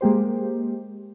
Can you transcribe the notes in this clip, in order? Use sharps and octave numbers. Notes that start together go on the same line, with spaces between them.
G#3 A#3 G4 C5